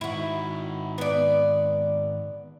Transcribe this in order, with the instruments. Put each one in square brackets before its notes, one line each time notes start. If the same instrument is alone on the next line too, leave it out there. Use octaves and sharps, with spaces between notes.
[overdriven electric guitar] G#2 D#3 [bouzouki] E4 F#4
[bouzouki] B3 D5